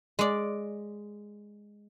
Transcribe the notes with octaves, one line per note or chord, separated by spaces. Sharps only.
G#3 D5